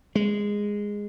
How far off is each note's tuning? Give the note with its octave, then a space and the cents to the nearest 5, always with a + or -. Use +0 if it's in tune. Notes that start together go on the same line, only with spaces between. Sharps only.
G#3 -10